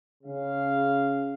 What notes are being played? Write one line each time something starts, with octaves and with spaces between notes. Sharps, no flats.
C#3 F5